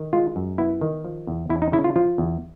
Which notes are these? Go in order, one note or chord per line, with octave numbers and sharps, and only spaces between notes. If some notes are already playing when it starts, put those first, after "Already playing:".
Already playing: D#3
G#3 F4
F#2
B3 E4
D#3
F3
E2
E2 E4
D#4
C#3 E4
F4
F3 F4
E2